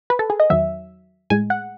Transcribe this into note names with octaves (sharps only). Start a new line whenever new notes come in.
B4
A4
G#4
D#5
E2 D#3 F#3 E5
A2 G#3 G#5
F#5